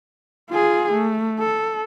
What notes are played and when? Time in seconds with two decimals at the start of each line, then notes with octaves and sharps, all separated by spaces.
0.50 F4 G#4
0.93 A3
1.39 A4